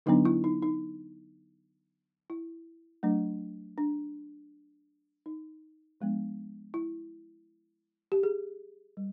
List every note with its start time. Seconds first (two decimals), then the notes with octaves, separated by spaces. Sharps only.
0.06 D3 F#3 B3 D4 D#4
0.25 E4
0.44 D#4
0.63 D#4
2.30 E4
3.03 F#3 A3 D4
3.78 D4
5.26 D#4
6.01 F3 G#3 B3 D4
6.74 E4
8.12 G4
8.23 G#4
8.97 G3